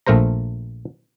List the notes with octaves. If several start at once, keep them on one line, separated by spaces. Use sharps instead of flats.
A#1 A3 A#4 C5 A#5